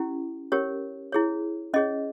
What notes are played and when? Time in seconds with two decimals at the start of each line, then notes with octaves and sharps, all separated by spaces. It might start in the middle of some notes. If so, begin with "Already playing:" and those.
Already playing: C#4 E4 G4
0.52 C#4 G4 A#4 C#5
1.12 E4 G#4 C#5
1.74 C#4 G#4 C#5 D#5